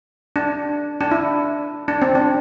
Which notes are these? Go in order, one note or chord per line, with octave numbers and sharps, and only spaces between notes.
D4
D4
E4
D4
C4
D4